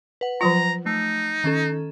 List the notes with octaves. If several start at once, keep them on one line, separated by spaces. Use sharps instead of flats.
B4 F#5
F3 F#3 F4 A#5
A3 D#4
D#3 C#4 A4